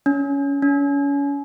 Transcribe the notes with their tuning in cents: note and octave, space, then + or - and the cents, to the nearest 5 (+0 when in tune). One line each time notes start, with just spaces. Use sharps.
C#4 +15
C#4 +30